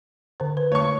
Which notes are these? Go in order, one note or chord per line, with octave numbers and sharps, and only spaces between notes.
D3 C5
B4
A3 C#5 C#6